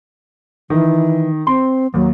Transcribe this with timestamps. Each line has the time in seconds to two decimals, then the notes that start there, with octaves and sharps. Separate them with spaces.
0.70 D#3 E3
1.47 C4 C6
1.94 D#2 F#3